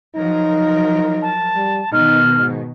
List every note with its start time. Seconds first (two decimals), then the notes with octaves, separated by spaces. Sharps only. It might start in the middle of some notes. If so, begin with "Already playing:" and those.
0.16 F3 F#3 D#4 A#4
1.22 A5
1.56 G3
1.92 B2 D#3 D#4 F6
2.35 G#2